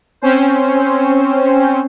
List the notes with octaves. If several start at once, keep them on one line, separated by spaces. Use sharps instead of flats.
C4 C#4 C5